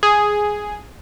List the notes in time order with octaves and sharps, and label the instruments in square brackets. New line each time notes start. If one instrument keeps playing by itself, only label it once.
[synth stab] G#4